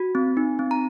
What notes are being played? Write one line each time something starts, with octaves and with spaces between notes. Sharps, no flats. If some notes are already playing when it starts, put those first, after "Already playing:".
Already playing: F#4
C4
D#4
C4
A#5